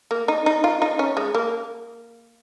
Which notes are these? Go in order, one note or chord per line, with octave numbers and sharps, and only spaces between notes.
A#3
D#4
D#4
F4
D#4
C#4
G#3
A#3